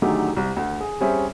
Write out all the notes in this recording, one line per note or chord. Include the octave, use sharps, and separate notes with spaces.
D3 D#3 F#3 A3 G4 G#4
C2
D2
G#4
G3 C4 C#4 G#4 E5